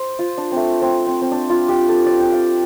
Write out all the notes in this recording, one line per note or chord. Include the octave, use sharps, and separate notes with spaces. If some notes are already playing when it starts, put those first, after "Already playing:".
Already playing: C5
F4
D4
A3 C4
C4
C4
C4
D4
F4
G4
A4
D5
G5
F5